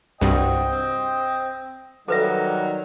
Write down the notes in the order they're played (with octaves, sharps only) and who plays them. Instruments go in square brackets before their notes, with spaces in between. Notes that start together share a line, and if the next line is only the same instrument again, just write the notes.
[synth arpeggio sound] C2 G2 [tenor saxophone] F#4 [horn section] C5 D#5 G5
[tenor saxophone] C4
[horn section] D#3 G3 [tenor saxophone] F#3 [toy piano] A4 B4 E5